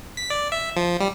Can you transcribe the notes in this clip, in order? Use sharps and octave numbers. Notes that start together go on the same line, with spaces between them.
B6
D5
E5
F3
G3